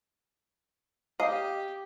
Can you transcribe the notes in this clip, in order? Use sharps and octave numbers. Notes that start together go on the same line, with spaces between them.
G4 D#5 F5